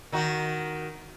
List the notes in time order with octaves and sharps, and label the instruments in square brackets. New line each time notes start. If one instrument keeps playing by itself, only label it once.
[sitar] D#3 D#4 F#4